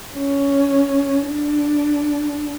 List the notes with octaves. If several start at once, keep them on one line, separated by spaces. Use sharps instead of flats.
C#4
D4